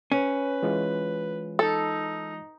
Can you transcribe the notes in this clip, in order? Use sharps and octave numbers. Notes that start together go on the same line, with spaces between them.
C#4 B4
E3 G#3 F4
D#4 A4